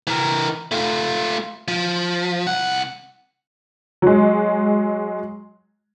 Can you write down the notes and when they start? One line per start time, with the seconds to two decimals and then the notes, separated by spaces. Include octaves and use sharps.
0.07 E3 A#4
0.72 A3 F4
1.68 F3
2.47 C2 F#5
4.02 F#3 G#3